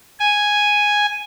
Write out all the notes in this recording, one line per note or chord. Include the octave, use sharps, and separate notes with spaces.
G#5